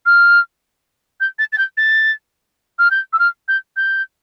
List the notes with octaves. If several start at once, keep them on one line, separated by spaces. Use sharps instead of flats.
F6
G6
A6
A6
G6
A6
F6
G6
E6
F6
G6
G6